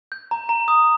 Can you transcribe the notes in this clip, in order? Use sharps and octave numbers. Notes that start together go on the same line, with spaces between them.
G6
A#5
A#5
D#6